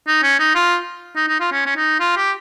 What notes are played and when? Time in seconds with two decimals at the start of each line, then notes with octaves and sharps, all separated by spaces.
0.07 D#4
0.23 C#4
0.39 D#4
0.55 F4
1.16 D#4
1.28 D#4
1.40 F4
1.52 C#4
1.66 C#4
1.76 D#4
2.00 F4
2.17 G4